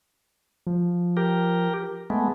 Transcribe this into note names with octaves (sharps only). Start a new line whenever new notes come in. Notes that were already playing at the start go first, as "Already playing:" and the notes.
F3
G4 A#4
G#3 A3 B3